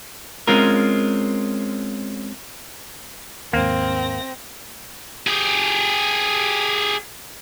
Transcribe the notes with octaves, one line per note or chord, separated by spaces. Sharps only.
G#3 C4 C#4 F4 A#4
D#2 G#2 A#3 C4 A#6
G4 G#4